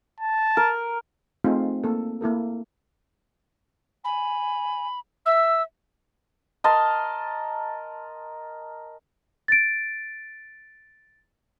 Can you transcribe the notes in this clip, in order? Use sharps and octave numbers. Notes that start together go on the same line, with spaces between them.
A5
A#4
A3 C4 D#4 F4 G#4
A#3 A4
A#3 E4 A4 A#4
G#5 B5
E5 E6
A#4 D#5 A5 C6
A6 D7